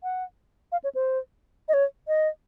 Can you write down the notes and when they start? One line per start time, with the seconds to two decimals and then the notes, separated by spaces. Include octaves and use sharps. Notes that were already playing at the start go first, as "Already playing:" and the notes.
0.03 F#5
0.72 F5
0.84 C#5
0.95 C5
1.68 D#5
1.74 C#5
2.08 D#5